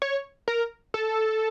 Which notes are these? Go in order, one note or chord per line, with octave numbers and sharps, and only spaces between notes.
C#5
A#4
A4